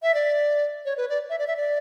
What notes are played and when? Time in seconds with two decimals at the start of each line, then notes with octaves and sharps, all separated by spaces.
0.03 E5
0.15 D5
0.85 C#5
0.97 B4
1.09 D5
1.30 E5
1.39 D5
1.47 E5
1.57 D5